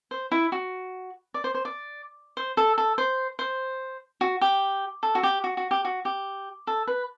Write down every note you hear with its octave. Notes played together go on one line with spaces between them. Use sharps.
C5
E4
F#4
D5
C5
C5
D5
C5
A4
A4
C5
C5
F#4
G4
A4
F#4
G4
F#4
F#4
G4
F#4
G4
A4
B4